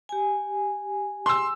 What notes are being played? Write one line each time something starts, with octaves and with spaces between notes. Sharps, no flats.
G4 G#5
C6 E6